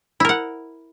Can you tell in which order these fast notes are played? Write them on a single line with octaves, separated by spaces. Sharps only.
E4 A#4 F#5